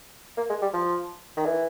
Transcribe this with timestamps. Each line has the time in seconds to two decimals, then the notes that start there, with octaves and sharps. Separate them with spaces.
0.37 A#3
0.50 G#3
0.61 G3
0.73 F3
1.37 D#3
1.45 E3